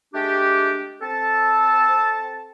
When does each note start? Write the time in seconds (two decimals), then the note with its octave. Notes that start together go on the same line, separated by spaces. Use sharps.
0.14 G#3 A3 D4 G4
1.01 C4 A4 A5